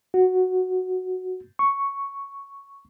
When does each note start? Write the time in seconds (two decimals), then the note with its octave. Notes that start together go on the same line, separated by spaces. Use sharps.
0.14 F#4
1.59 C#6